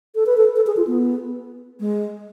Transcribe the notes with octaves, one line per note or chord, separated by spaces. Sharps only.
A4
B4
A4
A4
G#4
F4
B3
G#3